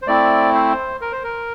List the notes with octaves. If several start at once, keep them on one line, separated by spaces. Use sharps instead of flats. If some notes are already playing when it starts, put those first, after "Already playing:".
C5
A3 C4 E4 D5
C5
A#4
C5
A#4